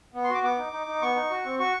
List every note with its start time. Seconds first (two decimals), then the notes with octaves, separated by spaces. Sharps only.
0.14 B3
0.24 C6
0.29 F#4 D6
0.43 B3 D6
0.58 D#4
0.72 D#4
0.87 D#4
1.02 B3 C#6
1.16 D#4
1.30 F#4
1.45 C4
1.59 F#4 C#6